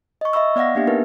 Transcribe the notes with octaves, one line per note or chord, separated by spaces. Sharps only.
D#5 C#6
D#5 E5 B5 C#6 E6
B3 D5 F5 F#5 A#6
A#3 D4 G4 E5
B3 D#4 A#4 B4